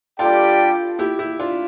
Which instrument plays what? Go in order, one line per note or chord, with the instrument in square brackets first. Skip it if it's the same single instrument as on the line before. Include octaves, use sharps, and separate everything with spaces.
[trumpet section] G3 D4 G4 D5 G5 [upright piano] F4 A4
[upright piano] E4 G4
E4 G4
D4 F4